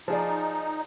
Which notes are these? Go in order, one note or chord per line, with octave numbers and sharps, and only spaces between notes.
F3 D#4 G#4 D5